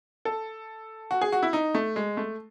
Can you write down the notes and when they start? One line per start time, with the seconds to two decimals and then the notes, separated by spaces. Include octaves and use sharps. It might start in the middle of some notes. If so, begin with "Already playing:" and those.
0.25 A4
1.11 F#4
1.21 G#4
1.32 F#4
1.43 E4
1.53 D#4
1.75 A3
1.96 G#3
2.17 A3